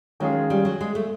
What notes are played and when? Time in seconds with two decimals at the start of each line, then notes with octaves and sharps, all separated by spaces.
0.20 D#3 F#3 G#3 C#4 F4 G#4
0.50 G3
0.65 F#3
0.81 G#3
0.95 A3